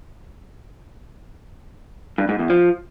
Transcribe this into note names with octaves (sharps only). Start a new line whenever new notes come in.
G2
G#2
E2
F3